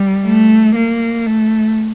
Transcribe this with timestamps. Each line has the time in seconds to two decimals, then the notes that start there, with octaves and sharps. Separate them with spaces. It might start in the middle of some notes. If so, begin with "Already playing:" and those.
Already playing: G3
0.25 A3
0.76 A#3
1.27 A3